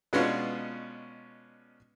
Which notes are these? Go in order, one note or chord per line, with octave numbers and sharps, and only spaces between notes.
B2 G#3 B3 C#4 D4 F4